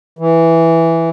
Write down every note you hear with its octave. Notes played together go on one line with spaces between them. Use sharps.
E3